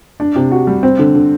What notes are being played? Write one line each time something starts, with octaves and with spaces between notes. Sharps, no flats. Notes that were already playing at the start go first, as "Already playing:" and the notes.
D4
C3
F#4
G3
C4
D3
D3